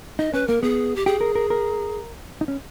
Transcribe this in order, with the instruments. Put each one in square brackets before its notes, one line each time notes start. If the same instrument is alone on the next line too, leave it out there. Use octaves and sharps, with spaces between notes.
[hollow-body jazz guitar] D#4 [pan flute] D#5
[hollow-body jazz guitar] C#4 [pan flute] B4
[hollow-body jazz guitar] A#3 [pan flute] A#4
[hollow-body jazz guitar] B3 [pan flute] G#4
[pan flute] G4
[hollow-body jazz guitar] G4 [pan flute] G#4
[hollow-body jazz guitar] A#4
A#4
A#4
D#4
C#4